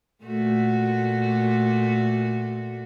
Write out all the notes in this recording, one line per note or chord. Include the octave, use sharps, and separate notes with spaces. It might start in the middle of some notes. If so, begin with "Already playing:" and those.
A#2 A3 F#4